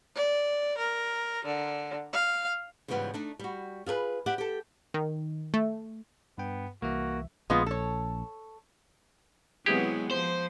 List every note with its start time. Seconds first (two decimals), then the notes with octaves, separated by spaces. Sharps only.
0.16 D5
0.78 A#4
1.45 D3
2.13 F5
2.88 G#2 C#3 E3 G3 B3 F4
3.14 A3 D4 D#4
3.39 G3 F#4
3.86 F4 G#4 A#4 B4
4.26 G4 D5 E5 F#5
4.38 G4 A4
4.94 D#3
5.54 A3
6.38 G2 B3 G5
6.82 C2 E3 A#3 F#4 E5
7.50 A#1 G#3 B3 F4
7.66 A4 C#5
9.66 C3 E3 F#3 G#3 B3 G4 G#4
10.11 F3 C5